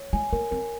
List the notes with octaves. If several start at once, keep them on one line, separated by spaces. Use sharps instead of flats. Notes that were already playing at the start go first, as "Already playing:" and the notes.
Already playing: C#5
G#3 G#5
A#3 A#4
C4 A#4